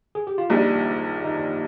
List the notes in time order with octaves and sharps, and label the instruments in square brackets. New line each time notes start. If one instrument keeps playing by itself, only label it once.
[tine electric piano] G#4
G4
F4
[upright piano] A#1 A#2 G3 D4 [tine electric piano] D#4
[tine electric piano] D#4